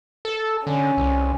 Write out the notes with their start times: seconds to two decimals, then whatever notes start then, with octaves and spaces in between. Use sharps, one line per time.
0.25 A4
0.67 D3 C#4
0.98 C2